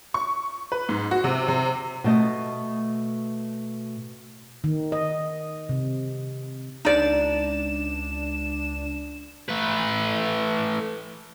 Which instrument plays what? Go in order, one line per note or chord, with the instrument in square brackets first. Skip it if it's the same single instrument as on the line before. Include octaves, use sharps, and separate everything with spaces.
[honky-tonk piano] C#6
B4
G#2
F#4
C3
C3
[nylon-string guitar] B2 A3 D#5
[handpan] D#3
D#5
C3
[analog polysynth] C#2 D4 E7 [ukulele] D#4 D5
[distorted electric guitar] A3 B4